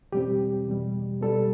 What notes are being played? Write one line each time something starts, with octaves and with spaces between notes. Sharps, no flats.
E2 B2 G3 C4 G4
E2 B2 G3
B2 G3 B3 A4